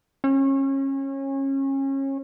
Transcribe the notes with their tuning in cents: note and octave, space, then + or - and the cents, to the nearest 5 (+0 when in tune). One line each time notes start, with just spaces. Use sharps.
C#4 -30